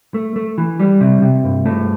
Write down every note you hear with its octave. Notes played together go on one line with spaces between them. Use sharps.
A3
A3
E3
G3
C3
C3
G2
A3